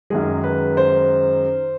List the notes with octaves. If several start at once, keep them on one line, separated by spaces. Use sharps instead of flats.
F#2 D#3 G#3 G#4
B4
C5